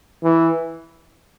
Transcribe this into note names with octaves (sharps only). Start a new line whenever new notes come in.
E3